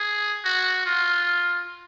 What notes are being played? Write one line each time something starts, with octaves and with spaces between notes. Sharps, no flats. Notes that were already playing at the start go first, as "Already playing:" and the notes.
Already playing: G#4
F#4
F4